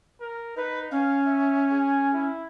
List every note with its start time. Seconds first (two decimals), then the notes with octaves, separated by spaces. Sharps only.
0.21 A#4
0.57 D#4 B4
0.91 C#4 F5
1.26 E5
1.71 G#4
2.14 E4